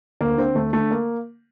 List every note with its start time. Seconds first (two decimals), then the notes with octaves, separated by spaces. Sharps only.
0.21 D2 A#3
0.38 D3 C4
0.55 D2 A3
0.73 D3 A3
0.91 A#3